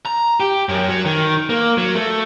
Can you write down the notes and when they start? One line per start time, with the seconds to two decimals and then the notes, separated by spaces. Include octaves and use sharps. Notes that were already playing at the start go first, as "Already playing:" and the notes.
0.06 A#5
0.40 G4
0.69 F#2
0.89 F#3
1.05 D#3
1.50 A#3
1.78 F#3
1.95 A3